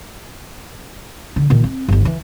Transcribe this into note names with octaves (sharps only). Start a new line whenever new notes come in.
D3
A#2 D#3
C4
G1 D#2
E3